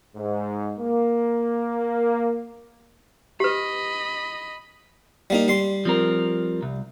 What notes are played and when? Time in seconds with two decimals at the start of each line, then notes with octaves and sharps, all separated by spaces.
0.16 G#2
0.80 A#3
3.40 G4 B4 D#5 B5
5.30 G3 A#3 D#4
5.48 G3 C6
5.85 F3 C4 A#4
6.63 C2